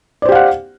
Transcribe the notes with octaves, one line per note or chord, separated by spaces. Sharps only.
G4 C5 D5 F5 F#5